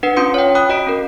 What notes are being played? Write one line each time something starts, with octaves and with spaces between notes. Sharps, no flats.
D4 B4 F#5 C7
C#4 F4 C6 D#6 C#7
C#5 G5
G5 B5 D#6 F#6
F#4 D#5 B6 D7
C#4 A#4